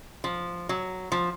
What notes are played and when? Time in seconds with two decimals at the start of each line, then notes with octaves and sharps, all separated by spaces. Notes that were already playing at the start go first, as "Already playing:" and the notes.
0.24 F3
0.69 F#3
1.12 F3